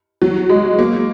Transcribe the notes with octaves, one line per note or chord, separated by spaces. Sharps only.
F#3
G#3
A#3